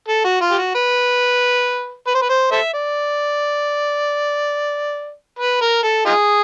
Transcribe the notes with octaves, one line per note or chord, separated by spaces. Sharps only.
A4
F#4
F4
G4
F#4
B4
B4
C5
B4
C5
A4 C5 E5
D5
B4
A#4
A4
D#4 F4 G#4